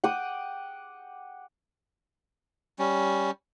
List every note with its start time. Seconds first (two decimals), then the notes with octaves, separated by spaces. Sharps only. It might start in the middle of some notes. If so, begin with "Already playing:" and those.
0.04 F#5 G5 D6 D#6
2.79 G3 C#4